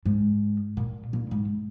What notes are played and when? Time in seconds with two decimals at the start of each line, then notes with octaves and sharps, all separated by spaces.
0.05 G#2
0.77 A#2
1.13 A#2
1.31 G#2